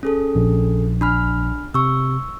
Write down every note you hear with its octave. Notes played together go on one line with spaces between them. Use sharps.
C#4 G#4 A4
A#1
D4 B5 F6
C3 C#6 E6